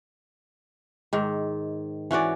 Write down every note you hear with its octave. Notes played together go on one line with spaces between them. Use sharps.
G#2 D#3
E3 C#4 F#4 D5